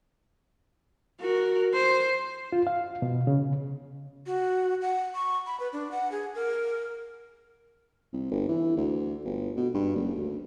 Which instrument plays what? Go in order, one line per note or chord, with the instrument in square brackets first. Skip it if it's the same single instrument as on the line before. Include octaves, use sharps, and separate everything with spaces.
[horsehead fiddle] F#4 A#4
C5
[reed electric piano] F4
F5
B2
C#3
[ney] F#4
F#5
C#6
B5
B4
D4
F#5
G#4
A#4
[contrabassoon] C2
G1
E3
D2
G1
B2
G2
F#1
D2